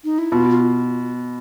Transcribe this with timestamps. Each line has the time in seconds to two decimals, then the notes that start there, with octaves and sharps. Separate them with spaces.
0.04 D#4
0.18 E4
0.32 B2 F4
0.49 F4